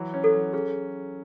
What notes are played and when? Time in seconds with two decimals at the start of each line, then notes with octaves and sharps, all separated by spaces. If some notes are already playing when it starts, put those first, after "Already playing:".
Already playing: E3 F#3
0.14 C#4
0.24 A4
0.34 F#3
0.53 C#4 G#4